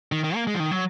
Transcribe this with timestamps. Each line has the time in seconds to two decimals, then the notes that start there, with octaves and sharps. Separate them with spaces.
0.12 D#3
0.24 D#3
0.35 A#3
0.47 G#3
0.54 F3
0.60 D#3
0.71 F#3